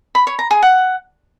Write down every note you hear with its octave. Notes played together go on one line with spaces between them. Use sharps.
B5
C#5
A#5
G#4
F#5